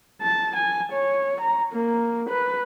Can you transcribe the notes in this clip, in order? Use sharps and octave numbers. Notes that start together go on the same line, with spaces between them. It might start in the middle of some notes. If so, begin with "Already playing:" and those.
A5
G#5
C#5
A#5
A#3
B4